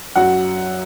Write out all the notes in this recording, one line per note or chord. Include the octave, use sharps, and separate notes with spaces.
F#2 F#3 F#5